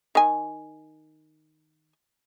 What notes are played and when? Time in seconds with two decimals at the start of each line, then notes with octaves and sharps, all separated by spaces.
0.15 D#3 G#5